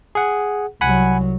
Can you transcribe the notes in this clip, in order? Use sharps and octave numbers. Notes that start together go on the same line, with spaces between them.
G#4 F#5
C2 F#3 F#5 G#5 B5